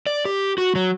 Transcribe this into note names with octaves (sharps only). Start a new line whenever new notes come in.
D5
G4
F#4
F#3